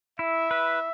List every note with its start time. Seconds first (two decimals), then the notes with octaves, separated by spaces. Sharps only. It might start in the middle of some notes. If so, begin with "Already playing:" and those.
0.19 E4 E5
0.51 B4